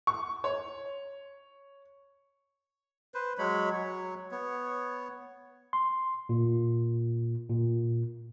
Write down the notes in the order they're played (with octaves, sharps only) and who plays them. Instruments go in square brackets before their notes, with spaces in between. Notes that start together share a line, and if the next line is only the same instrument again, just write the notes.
[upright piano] C#6
C#5
[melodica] B4 C5
F#3 G#3 C#5 B5
F#3 C#5
B3 C#5
[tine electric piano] C6
A#2
A#2